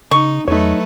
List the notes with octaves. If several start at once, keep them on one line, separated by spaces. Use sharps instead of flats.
C#3 D#4 C#6
E2 F#3 A3 D#4 B4 C#5